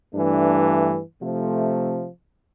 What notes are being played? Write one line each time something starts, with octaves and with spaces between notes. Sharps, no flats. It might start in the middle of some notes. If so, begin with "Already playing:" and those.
G2 E3 A3 D4
C3 F3 A3